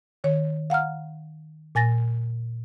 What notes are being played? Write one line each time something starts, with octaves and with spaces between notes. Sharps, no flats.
D#3 C#5
F5 F#5 A#5 F6
A#2 G#5 A6 A#6